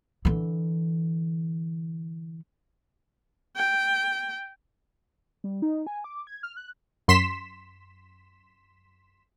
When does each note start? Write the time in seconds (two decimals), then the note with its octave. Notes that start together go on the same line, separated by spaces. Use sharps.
0.25 D3 E3
3.57 G5
5.44 G3
5.62 D#4
5.87 G#5
6.04 D6
6.27 G#6
6.43 F6
6.57 F#6
7.08 F#2 C6 B6 E7